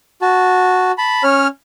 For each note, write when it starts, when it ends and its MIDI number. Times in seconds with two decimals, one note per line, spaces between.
0.22 0.92 66
0.22 0.92 81
0.98 1.23 81
0.98 1.23 83
1.24 1.47 61
1.24 1.47 73
1.24 1.47 89